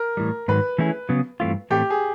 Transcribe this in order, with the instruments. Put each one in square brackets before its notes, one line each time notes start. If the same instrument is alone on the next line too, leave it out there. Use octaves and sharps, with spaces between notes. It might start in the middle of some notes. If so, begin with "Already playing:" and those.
Already playing: [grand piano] A#4
[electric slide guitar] A2 E3 G3
[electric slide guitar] G#2 D#3 F#3 [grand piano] B4
[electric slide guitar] E3 A3 C#4 E4 G#4
C#3 F#3 B3
G2 E3 A3 C4 F4
[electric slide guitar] A2 E3 A3 C4 [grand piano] G4
[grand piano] G#4